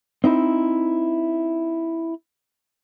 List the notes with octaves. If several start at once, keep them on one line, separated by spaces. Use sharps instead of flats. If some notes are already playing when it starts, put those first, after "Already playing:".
C4 D#4 E4